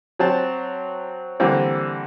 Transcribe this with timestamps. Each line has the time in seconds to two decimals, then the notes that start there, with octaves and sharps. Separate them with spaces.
0.19 F#3 C4 A5
1.40 D3 E3 G3 A#3 C4